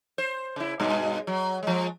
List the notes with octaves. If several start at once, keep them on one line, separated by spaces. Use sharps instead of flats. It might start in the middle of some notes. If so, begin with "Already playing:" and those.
C5
C#3 E4
G2 B2 G#3
F#3
F3 G#3